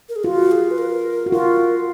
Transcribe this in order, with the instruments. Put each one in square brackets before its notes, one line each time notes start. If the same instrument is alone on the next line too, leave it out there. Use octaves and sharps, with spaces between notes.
[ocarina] A#4
G#4
[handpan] F4 [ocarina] F#4
[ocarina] G#4
B4
A#4
[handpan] F#4
[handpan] F4 [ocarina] A#4